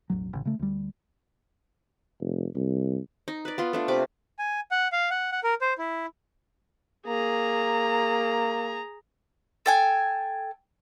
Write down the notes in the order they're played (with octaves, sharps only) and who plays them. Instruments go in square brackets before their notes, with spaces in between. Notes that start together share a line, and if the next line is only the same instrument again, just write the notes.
[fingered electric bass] E1 A1 F#3
A1 C#3
C#3 A3
D2 G3
[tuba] F1
C2
[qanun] D#4
B4 D5
B3 F4 C6
A3 D4 F4
C3 B4 D6
[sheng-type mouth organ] G#5
F#5
F5
F#5
F#5
A#4
C5
E4
[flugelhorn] A#3 [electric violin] G#4 A#5
[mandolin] A4 G5 G#5